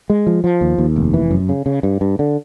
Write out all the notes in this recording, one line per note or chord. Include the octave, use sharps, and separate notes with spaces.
G#3
F3
F3
D#2
D#2
F1
E3
F#2
C#3
C#3
G2
G2
D3